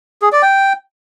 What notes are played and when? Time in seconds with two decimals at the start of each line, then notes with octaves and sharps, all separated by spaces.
0.22 G#4
0.32 D5
0.43 G5